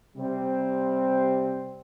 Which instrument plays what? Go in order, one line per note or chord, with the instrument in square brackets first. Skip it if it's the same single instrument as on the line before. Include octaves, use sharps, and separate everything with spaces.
[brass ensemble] C3 G3 C4